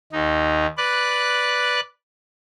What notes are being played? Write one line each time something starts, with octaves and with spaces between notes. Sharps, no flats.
D#2 D#4
B4 D5 F#6